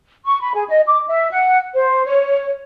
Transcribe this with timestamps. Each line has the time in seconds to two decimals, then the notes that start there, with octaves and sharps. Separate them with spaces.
0.24 C#6
0.40 B5
0.54 G#4
0.68 D#5
0.86 D6
1.07 E5
1.31 F#5
1.73 C5
2.05 C#5